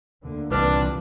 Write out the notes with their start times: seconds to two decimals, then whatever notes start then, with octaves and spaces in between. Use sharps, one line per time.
0.23 D2 D3 A#3
0.51 C2 A#2 E3 F3 D4 F4 B4